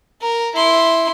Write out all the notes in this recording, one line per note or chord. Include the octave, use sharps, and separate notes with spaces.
A#4
E4 C6